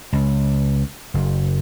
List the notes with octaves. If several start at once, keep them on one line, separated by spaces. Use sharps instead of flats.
C#2
F#1